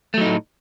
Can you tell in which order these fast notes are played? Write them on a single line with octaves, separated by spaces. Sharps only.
A3 F#3 D#4 A2